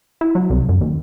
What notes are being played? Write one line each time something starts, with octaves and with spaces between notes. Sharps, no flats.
E4
F#3
C2
F#2
D#2